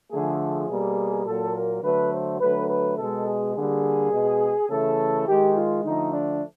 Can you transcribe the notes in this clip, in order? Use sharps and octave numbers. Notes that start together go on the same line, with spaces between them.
D3 F3 A3 G#4
G#4
B2 G3 A#3
A#2 F#3 A#3 A4
A#4
D3 F#3 A3 B4
C5
D3 F#3 A3 B4
B4
B2 G#3 A4
G#4
D3 G3 A#3 G#4
B2 G#3
C#3 E3 A3 A4
D#3 G#3 G4
F4
D3 F3 A3 D#4
D4